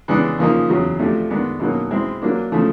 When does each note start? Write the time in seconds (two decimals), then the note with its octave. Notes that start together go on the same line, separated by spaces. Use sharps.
0.08 C#3 E3 G#3 B3 D4
0.38 C#3 F3 A#3 D#4
0.69 E2 C#3 F#3
0.99 C3 F3 A3 D4
1.30 D#3 G#3 B3 D4
1.60 B2 F#3 A#3 D#4
1.91 G#3 C4 E4
2.22 F#3 A#3 D4
2.52 C#3 F3 A3